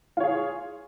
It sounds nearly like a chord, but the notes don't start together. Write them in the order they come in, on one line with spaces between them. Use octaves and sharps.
F4 C#5 G#4